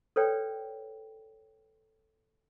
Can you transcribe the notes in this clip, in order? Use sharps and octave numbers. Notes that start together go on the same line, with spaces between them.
A4 B4 C#5 D5 G5